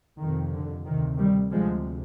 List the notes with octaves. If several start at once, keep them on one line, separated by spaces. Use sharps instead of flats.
F2 C3 D#3
D3
D2 C3 D#3
D#3 G3
D2 C3 F3 G#3